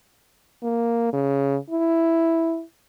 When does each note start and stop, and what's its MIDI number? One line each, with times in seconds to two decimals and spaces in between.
0.63 1.09 58
1.13 1.56 49
1.70 2.62 64